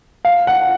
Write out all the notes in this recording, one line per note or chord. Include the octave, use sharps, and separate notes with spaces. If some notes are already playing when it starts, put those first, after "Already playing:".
F5
F#5